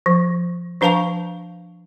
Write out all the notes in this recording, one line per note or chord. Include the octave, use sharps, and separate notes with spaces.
F3
F3 D4 B4 F5 A5 C#6